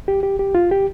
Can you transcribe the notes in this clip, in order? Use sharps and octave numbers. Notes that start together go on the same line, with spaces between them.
G4
G4
G4
F4
G4